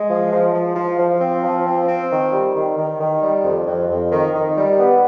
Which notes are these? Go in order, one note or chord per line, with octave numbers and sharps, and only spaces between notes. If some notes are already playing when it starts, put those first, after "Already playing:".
Already playing: G#3
F3
F3
F3
F3
F3
C4
F3
C4
C4
D#3
G3
D#3
D#3
D#3
G3
F2
F2
F2
D#3
D#3
G3
B3